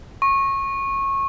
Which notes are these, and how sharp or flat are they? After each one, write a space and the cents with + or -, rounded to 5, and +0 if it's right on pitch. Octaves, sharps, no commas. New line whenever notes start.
C#6 -20